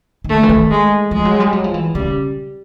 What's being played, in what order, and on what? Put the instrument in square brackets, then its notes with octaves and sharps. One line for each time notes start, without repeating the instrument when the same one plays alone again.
[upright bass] D#3
[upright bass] D3 [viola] A3
[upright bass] E3
D#3
[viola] G#3
[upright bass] F3 [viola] G#3
[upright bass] F#3
G3
F#3
F3
E3
[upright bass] C#3 [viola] G3